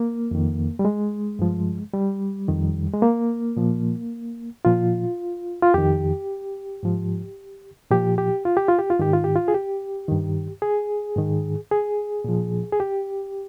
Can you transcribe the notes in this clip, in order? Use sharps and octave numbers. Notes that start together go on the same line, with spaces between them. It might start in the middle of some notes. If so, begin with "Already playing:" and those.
Already playing: A#3
F2 D#3
G3
G#3
G2 F3
G3
F2 D#3
G#3
A#3
A#2 F3
A#2 F3 F4
F4
F2 D#3 G4
G#2 F3
A#2 F3 G4
G4
F4
G4
F4
G4
F4
G#2 D#3 G4
F4
G4
F4
G#4
G4
G2 D#3
G#4
G#2 D#3
G#4
A#2 F3
G#4
G4